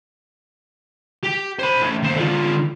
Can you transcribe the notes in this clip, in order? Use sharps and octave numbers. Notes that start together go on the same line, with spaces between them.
G4
C5 B5
A3 C#4
D#2 C5
D3 F4